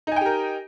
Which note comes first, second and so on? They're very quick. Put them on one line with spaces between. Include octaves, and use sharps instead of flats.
D#4 G#5 G5 G4 A#4